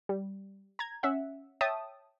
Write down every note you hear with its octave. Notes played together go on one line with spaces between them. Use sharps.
G3
A#5 G#6
C#4 E5 F#5
C#5 E5 G5 A5 D#6